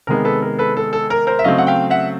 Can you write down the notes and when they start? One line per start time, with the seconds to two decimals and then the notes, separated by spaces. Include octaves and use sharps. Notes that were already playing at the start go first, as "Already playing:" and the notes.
0.07 C3 D#3 G#3 B3 A#4
0.25 A4 B4
0.42 A#4
0.59 A4 B4
0.77 A4
0.93 A4
1.10 A#4
1.27 A#4 C5
1.39 E5
1.44 C#3 F#3 A3 C4 D#5 F5
1.58 F#5
1.67 F5 G5
1.90 E5 F#5